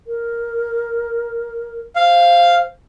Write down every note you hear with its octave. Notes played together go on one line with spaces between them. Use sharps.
A#4
C5 F5